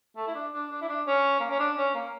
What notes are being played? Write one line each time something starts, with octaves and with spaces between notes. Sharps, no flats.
A3
E4
D4
D4
D4
E4
D4
C#4
A#3
C#4
D4
C#4
A#3